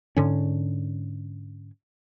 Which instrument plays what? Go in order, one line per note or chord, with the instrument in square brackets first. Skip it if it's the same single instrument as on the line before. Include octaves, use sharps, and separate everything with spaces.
[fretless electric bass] G#2 D3 C#4